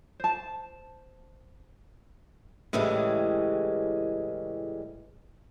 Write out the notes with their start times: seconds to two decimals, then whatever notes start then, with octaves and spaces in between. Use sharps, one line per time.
0.20 C5 A5
2.73 A2 C#3 E3 G3 G#3